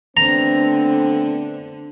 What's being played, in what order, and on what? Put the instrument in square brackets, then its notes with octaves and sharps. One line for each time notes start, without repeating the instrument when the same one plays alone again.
[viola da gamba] D3 D4 [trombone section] A3 B3 C4 [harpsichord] A#5